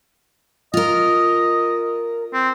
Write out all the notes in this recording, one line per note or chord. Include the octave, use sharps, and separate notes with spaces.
F4 A#4 D#5
C4